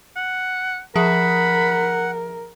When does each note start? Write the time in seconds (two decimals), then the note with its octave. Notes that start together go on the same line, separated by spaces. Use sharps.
0.16 F#5
0.96 F3 G#4 A#4 E5 F#5 B5